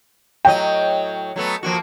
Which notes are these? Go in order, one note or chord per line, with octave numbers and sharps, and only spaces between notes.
A2 F#3 D#5 G5
F#3 A3 B3
F3 A#3 F#4